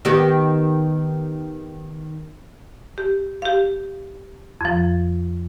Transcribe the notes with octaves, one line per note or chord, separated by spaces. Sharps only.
D#3 B3 G4
G4
G4 F5
F2 F3